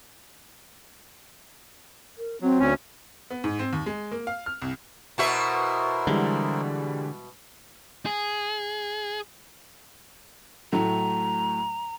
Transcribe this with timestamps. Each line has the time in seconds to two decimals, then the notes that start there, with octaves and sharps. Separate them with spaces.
2.18 A#4
2.42 F#3 C4
2.60 D2 C#4
3.30 B3
3.44 G#2
3.59 C4
3.73 D#2
3.86 G#3
4.12 A#3
4.27 F5
4.46 F6
4.62 C2
5.18 B2 E4 F#4 A#4 C5 E5
6.07 D3 E3 G3 G#3
8.06 G#4
10.72 A2 F#3 A3 A#5